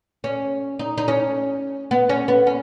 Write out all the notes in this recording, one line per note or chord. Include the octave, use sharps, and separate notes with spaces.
C#4
D#4
D#4
C#4
B3
C#4
B3
C#4